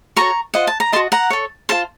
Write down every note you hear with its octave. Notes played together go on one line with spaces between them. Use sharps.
F#4 A4 C#5 A#5 C#6
F4 C5 D#5 F#5
A5
A#5
F#4 A#4 D#5 A5 C6
F#5 A#5
A4 C#5
F4 A4 C5 A5 C6